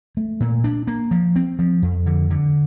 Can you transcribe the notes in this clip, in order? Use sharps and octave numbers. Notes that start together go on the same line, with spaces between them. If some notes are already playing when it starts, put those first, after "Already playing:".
A3
A#2
D4
A#3
F3
C4
F3
F2
D3
D3